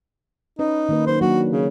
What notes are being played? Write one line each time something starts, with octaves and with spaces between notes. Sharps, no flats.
C#4 D#4 B4
D#3 A#3 B4
F#3 D#4 C5
F#3 A#3 D4 F#4
C#3